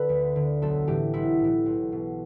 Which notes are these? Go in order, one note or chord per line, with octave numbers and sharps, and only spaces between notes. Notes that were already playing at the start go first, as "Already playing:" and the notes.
Already playing: D3 A4 B4
D2
D3
B1 A4
A2 E3 G4
B1 E4
A2 E3
B1
B2